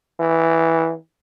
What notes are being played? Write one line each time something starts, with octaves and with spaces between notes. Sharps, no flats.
E3